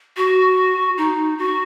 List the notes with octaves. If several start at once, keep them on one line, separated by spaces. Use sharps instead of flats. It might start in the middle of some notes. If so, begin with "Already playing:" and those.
F#4
D#4
F#4